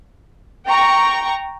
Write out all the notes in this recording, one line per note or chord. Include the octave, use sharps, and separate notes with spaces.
G5 A#5 C#6